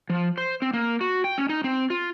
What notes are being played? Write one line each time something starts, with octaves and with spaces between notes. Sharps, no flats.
F3
C5
C4
A#3
F#4
G5
C#4
D#4
C4
F4